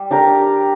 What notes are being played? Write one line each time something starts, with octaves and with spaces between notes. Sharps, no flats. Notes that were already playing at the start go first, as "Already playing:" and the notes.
Already playing: G3
D4 G4 A#4